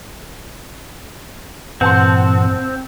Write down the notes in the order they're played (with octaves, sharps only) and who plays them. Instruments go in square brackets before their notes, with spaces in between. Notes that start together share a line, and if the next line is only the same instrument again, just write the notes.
[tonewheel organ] G2 A#2 E3 [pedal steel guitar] C4 [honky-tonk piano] F#5 A5 C6